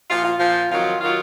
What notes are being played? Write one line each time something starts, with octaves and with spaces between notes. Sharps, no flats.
A#2 F3 F4
F4
A#2 F3
F2 D#3 F#3 F4
D#3 F#3 F4